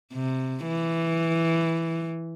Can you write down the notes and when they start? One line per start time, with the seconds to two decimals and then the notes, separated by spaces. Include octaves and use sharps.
0.13 C3
0.67 E3